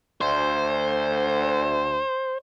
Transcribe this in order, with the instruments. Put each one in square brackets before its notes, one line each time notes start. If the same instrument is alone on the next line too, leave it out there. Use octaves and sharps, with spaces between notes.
[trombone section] D2 [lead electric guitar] C5